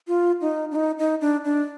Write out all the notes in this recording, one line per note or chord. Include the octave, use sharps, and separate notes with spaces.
F4
D#4
D4
D#4
D#4
D4
D4